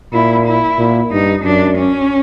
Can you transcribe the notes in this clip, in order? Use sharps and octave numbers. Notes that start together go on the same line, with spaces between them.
A#2 E4
E4
A#2
G2 D#4
F#2 D4
C#4